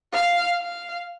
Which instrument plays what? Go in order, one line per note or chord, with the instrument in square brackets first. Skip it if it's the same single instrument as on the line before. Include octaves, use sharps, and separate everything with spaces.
[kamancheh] F5
F5